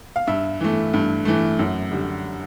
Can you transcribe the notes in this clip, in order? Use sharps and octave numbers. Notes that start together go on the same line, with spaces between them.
F5
G2 E5
E3 A3
G2
E3 A3
F#2
D3 G3